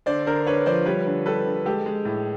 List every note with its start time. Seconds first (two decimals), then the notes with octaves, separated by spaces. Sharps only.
0.06 D3 C5 D5
0.26 D3 A#4 C5
0.47 D3 B4 C#5
0.66 F3 C5 D5
0.86 G3 B4 C#5
1.06 D3
1.26 G3 A4 B4
1.46 D3
1.65 G#3 G4 A4
1.86 G#3
2.05 A2